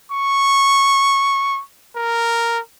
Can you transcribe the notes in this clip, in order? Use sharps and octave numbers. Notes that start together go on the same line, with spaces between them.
C#6
A#4